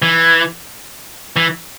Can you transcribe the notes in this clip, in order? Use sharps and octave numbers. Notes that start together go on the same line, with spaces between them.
E3
E3